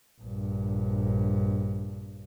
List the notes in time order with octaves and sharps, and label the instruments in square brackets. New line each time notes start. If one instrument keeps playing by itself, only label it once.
[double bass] A#1 G2